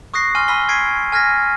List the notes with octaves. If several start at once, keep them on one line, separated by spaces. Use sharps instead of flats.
C#6 D#6 F#6 A#6 C7
G#5 C6 F6 D#7
B5 E6 B6 G7
C#6 G#6 B6 C7 D7
G#5 F6 G#6 A#6 B6